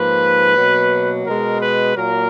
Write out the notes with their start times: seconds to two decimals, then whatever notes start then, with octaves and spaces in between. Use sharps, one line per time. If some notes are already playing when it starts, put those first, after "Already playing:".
Already playing: G#2 F3 A#3 B4
0.57 B2 F#3 A#3
1.25 B2 G#3 A#4
1.60 B4
1.95 A#2 F#3 A#3 A#4